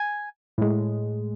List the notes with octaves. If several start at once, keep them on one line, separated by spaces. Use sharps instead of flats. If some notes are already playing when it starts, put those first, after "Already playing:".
Already playing: G#5
A2 G#3